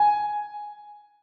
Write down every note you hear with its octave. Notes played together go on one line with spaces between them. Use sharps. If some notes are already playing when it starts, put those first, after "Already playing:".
Already playing: G#5